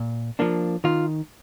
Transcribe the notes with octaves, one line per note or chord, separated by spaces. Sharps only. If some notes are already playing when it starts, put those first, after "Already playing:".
Already playing: A#2
F3 A#3 D4
D#3 F4